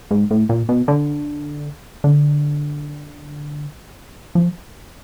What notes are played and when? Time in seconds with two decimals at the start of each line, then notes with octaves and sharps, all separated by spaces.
0.11 G#2
0.31 A2
0.49 A#2
0.69 B2
0.88 D3
2.04 D3
4.35 F3